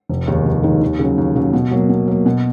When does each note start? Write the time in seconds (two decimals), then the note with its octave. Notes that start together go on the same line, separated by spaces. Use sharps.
0.09 F1
0.28 D#2 D#3 G#3
0.46 F1
0.63 D#2 D#3 G#3
0.81 D#2
0.99 C#3 F#3
1.18 D#2
1.36 C#3 F#3
1.53 B2
1.71 F#3 A#3
1.89 B2
2.08 F#3 A#3
2.26 B2